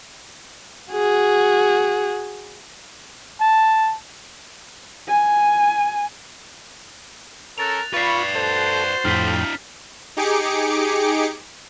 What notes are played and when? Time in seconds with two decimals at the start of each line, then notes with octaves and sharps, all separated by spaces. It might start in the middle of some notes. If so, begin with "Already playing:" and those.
0.92 F#4 G#4
3.40 A5
5.08 G#5
7.58 C#4 A4 A#4 F#6 A6 F7
7.94 F4 B4 D5 B5 C#6 A6 C7
8.35 F#4 A4 C5
9.05 F2 A2 D4 E4 G5 F6 B6
10.17 D#4 G4 G#4 D6 C#7